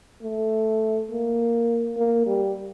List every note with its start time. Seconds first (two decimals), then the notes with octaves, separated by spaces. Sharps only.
0.23 A3
1.11 A#3
1.97 A#3
2.27 G3